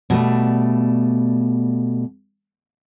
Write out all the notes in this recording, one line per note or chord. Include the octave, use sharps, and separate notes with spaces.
B2 G3 A3